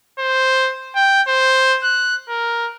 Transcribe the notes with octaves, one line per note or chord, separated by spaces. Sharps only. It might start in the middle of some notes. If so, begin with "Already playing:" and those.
C5
G5
C5
F#6
A#4